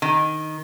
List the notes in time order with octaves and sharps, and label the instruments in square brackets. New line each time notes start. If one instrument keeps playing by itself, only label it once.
[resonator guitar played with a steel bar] D#3